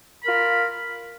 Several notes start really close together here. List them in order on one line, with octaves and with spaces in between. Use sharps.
B5 A#4 F4